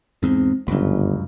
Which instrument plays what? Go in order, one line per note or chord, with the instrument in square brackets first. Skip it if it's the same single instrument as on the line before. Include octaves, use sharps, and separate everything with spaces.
[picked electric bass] E2 G#2 [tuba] C4
[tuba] G1 [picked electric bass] C#2 F#2